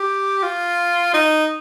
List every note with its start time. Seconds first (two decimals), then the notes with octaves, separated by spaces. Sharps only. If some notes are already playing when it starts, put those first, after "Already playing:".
Already playing: G4
0.43 F4
1.14 D#4